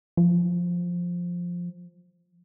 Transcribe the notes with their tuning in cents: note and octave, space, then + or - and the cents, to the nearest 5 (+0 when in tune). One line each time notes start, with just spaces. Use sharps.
F3 +5